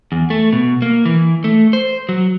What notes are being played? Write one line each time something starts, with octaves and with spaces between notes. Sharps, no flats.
E2
A3
B2
A#3
E3
A3
C5
F#3